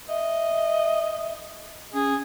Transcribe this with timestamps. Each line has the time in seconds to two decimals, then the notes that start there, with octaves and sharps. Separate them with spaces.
0.09 D#5 E5
1.93 C#4 G#4